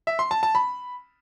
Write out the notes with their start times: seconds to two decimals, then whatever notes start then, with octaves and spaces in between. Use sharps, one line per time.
0.07 E5
0.19 C6
0.31 A5
0.43 A5
0.55 B5